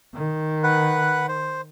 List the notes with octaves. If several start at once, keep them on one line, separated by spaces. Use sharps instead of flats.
D#3
B4 F#5
C5